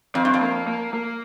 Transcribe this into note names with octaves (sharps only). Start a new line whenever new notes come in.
F2 C4
G2
F2
A#3
A#3
A#3